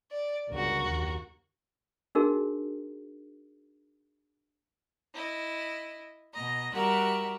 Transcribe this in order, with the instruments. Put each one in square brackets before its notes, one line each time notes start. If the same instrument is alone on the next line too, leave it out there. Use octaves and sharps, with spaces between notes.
[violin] D5
[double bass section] G1 C#2 D3 [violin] A#3 F#4
[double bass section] F#1 D#2
[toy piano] D4 D#4 F#4 G#4 A#4
[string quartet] E4 D#5
B2 D#5 A#5
G3 F#4 G4 A#4 E5 F#6